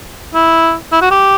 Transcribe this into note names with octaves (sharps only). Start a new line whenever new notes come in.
E4
E4
F#4
G4